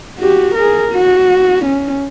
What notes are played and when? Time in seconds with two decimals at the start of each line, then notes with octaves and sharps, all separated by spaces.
0.19 F#4 G4
0.55 G#4 A#4
0.92 F#4
1.65 C#4